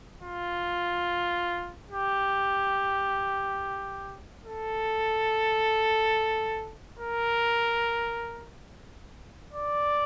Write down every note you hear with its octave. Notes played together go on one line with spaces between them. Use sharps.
F4
G4
A4
A#4
D5